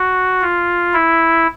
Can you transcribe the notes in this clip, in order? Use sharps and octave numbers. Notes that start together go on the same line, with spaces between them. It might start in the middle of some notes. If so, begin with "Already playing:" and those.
Already playing: F#4
F4
E4